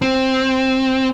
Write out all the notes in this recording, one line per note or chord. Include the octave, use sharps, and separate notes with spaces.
C4